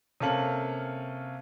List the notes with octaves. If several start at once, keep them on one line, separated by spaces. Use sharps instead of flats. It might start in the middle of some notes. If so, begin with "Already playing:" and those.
C3 A#3 C#4 A4 F5 F#7